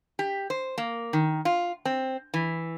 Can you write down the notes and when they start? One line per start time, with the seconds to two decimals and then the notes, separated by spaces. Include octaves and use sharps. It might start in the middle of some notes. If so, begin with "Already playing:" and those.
0.19 G4
0.50 C5
0.78 A#3
1.13 D#3
1.45 F4
1.85 C4
2.34 E3